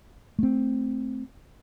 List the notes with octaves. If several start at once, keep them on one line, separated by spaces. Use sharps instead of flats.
A3 C4